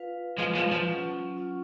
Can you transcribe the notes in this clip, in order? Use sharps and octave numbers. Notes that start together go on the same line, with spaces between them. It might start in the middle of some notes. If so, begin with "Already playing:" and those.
Already playing: F4 B4 F5
F3 G#3 F4 B4 F5
F3 G#3
F3
F#3 C#4 F4
F#3 C#4 F4